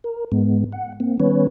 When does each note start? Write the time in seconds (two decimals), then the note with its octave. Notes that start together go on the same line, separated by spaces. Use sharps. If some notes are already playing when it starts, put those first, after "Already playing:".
0.04 A#4
0.32 G#2 G#3 B3
0.72 F#5
1.00 A#3 C4
1.20 D#3 G3 B3 C#4 B4 C#5